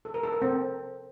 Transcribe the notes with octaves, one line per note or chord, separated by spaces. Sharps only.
A4
A#4
A4
A#4
C4